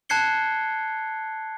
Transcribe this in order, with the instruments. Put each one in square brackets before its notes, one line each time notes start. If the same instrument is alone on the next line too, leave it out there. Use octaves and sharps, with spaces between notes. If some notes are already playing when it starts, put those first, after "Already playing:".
[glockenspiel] A5 F#6 G#6 C7 C#7 G7